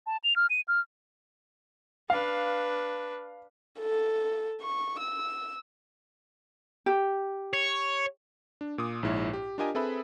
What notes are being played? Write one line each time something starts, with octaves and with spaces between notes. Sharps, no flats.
A5
F7
F6
D#7
F6
D4 B4 F5
A4
C#6
E6
G4
C#5
D4
A#2 D6 D#6
A#1 G#2 E4 C#5
G4
D4 F4 G4 A#4 D#5 G#5
C4 G#4 A4 B4 E5 B5